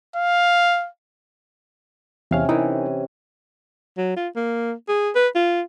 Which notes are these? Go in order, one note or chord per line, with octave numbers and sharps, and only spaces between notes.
F5
E2 C3 C#4 F5 F6
E3 D#4 A#4
F#3
F4
A#3
G#4
B4
F4